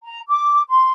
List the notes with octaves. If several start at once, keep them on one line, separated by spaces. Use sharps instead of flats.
A#5
D6
C6